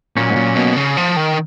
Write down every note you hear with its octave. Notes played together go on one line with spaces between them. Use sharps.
A#2 F#3 A#3 C#4
G#2
A#2
B2
C#3
F3
D#3